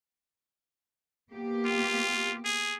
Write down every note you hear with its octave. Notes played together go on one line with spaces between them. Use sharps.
A#3 B3 G4
F4
G#4